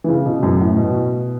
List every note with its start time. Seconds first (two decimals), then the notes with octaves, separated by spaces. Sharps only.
0.04 E3
0.08 C#3
0.26 B2
0.43 F#2
0.60 A2
0.76 B2